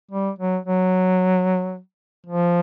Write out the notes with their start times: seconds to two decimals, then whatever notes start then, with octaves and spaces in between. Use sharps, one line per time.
0.11 G3
0.39 F#3
0.65 F#3
2.26 F3